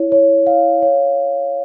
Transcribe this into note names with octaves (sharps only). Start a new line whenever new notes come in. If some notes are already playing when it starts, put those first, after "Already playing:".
Already playing: E4 C#5
C#5
F5
C#5